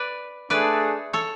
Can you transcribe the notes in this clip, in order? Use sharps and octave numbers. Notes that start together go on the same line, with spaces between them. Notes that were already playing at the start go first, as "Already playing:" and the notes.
Already playing: B4 D5
A3 D4 G#4 B4 D5
A4 C#5